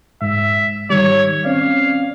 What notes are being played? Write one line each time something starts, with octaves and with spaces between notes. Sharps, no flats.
G#2 E5
D#3 G3 C#5
C4 C#4 D5 F5